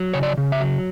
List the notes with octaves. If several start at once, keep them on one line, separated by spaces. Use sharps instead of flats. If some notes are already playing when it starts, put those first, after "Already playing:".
Already playing: F#3
C#3 C#5
D5
C#3
E5
F#3